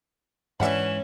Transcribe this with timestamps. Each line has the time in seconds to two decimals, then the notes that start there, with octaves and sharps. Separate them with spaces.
0.60 G#2 E3 G#3 C#4 D4 E5 F#5 B5